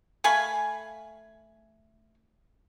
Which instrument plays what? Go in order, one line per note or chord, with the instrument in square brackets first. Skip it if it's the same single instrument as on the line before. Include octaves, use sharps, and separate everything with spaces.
[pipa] A3 F5 G#5 B5